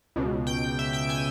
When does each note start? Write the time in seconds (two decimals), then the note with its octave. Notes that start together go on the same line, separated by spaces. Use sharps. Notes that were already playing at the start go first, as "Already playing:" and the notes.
0.16 C#2 B2
0.47 G5 G6
0.79 E5 E6
0.93 G5 G6
1.09 G#5 G#6